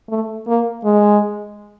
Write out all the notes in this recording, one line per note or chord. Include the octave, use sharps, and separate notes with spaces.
A3
A#3
G#3